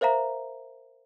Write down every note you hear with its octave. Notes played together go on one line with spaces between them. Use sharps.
A#4 C5 E5 F5 A#5